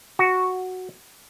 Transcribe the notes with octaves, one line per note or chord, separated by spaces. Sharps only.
F#4